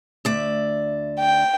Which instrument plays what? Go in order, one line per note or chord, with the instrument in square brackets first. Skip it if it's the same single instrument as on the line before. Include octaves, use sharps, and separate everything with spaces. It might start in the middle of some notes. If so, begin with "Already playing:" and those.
[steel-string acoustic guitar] D2 D5 E5
[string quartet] G5